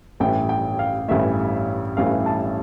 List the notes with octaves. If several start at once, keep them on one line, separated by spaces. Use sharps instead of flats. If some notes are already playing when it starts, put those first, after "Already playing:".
A1 G2 E3 A3 G5
G5
F5
A1 G2 E3 A3 E5
A1 G2 E3 A3 F5
A5